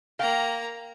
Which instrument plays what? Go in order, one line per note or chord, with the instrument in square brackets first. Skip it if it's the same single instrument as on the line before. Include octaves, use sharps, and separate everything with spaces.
[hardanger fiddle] A#3 A#5 [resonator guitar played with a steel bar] F5 G5